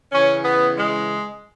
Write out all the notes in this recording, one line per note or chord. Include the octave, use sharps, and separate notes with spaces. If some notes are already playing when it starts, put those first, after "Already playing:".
C#3 E3 C#4
B3
G#3